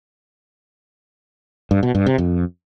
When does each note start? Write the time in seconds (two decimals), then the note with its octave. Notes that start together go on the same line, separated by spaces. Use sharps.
1.71 G2
1.83 B2
1.95 G2
2.06 C3
2.18 F2